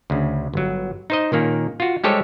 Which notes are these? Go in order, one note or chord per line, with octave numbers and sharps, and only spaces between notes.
D2 C#3
G1 F#3
D#4 C5 D#5
A#2 D#3 A#3 C#4
F4 F#4
G3 G#3 G4 A4 C5 C#5